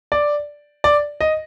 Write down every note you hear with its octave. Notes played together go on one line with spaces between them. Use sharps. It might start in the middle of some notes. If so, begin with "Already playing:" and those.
D5
D5
D#5